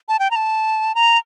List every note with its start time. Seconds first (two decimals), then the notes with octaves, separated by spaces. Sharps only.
0.09 A5
0.19 G5
0.31 A#5
0.36 A5
0.95 A#5